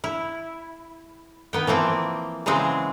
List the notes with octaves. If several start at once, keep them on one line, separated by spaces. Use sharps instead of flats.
E4
D#3 B3 G5
E3 F3 A#3 C4
C#3 E3 F#3 G#3 C4